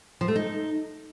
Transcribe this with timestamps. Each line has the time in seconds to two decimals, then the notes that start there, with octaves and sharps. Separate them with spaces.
0.21 F3
0.28 A3
0.35 D#4